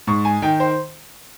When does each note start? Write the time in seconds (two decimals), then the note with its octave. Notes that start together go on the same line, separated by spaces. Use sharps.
0.07 G#2 C#6
0.25 G#5
0.42 D#3 G5
0.60 C5